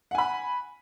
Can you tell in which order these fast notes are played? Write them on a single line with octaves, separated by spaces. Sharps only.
F#5 G#5 B5